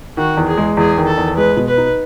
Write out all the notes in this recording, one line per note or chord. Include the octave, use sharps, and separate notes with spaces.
D#3 F#4
E2
G#4
G#3
E2 G#4
D#3
A4
E2
G#3 B4
B2
B4
D#4